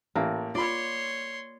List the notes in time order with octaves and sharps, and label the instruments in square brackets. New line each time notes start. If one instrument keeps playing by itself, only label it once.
[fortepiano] A1 [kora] A#3
[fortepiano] F4 B5 [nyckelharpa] C#5 C6 [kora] D5